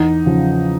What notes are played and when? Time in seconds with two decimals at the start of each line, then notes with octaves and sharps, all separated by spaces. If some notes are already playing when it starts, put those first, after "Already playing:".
Already playing: E2 D#4
0.26 C#3 F3